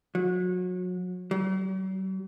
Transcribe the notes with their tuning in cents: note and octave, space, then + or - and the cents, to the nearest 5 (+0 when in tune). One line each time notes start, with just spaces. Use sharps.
F#3 -30
F#3 +45